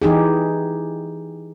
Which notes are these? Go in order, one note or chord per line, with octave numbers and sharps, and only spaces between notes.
E3 D#4 G4 G#4